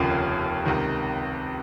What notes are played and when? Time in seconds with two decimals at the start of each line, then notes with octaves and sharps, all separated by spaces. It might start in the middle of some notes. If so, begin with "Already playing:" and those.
Already playing: F1 D#2 C#3 F3 A#3
0.66 C#2 C3 D#3